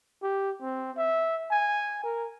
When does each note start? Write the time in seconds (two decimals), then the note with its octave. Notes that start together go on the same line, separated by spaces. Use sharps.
0.23 G4
0.62 C4
0.97 E5
1.51 G#5
2.04 A#4